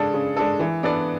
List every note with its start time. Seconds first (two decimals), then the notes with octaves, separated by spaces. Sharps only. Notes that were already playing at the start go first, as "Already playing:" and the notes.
Already playing: C#3 G#3 D4 A4
0.14 C#3
0.36 G#3 D4 A4
0.60 E3
0.83 B3 D4 A4 D5